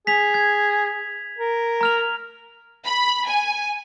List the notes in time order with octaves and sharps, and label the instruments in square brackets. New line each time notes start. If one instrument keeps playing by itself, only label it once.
[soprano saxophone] G#4 [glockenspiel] B6 F7
[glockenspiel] G#6
[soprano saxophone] A#4
[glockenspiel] A#5 F6 F7
[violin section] B5
G#5